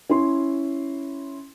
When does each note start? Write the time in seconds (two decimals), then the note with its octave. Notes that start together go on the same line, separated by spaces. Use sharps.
0.09 C#4 E4 C6